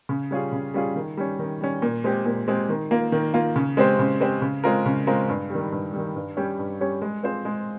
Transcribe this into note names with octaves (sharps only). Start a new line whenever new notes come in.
C#3
G3 C#4 F4 G#4
C#3
G3 C#4 F4 G#4
D#3
G3 C#4
D#3
G3 C#4
A#2
G#3 C4 G4
A#2
G#3 C4 G4
D#3
A#3 F4
D#3
A#3 F4
C#3
G#3 C4 G4 C5
C#3
G#3 C4 G4 C5
C#3
G#3 C4 F4 A#4
C#3
G#3 C4 F4 A#4
G2
D#3 G3
G2
D#3 G3
G2
G3 C#4 G4 C#5
G2
G3 C#4 G4 C#5
G#3
C4 F4 G#4 C5
G#3